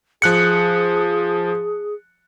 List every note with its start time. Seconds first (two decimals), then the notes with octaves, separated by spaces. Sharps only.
0.22 F3 G#4 F#6 C#7